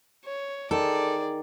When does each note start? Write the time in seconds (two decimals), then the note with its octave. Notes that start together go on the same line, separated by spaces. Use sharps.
0.25 C#5
0.71 D#3 G#4 A4 D5